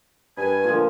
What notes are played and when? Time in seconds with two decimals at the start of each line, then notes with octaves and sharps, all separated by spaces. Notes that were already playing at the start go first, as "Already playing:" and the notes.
0.37 G2 B4 G#5
0.64 A#2 D3 F3